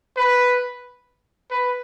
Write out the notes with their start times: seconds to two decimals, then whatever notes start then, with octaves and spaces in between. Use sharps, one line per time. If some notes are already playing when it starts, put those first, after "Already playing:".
0.17 B4
1.51 B4